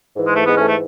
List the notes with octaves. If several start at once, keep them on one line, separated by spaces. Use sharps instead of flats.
G#2 E3
G#3
A3
G#3 B3
A3 C#4
A3